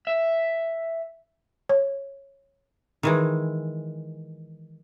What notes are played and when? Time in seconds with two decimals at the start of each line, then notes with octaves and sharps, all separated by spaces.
0.07 E5
1.69 C#5
3.03 D#3 E3 G#3